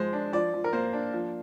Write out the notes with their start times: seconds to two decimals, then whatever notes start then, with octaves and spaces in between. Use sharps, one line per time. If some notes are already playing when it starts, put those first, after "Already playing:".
Already playing: F3 G#3 C5
0.13 D4
0.33 F3 D5
0.54 F3
0.64 A#4
0.73 A#3 C5
0.93 D4
1.13 F3